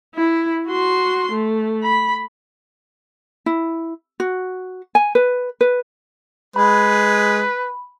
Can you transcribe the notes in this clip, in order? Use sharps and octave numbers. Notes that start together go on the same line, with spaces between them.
E4
F#4 C6
A3
B5
E4
F#4
G#5
B4
B4
G#3 B4 B5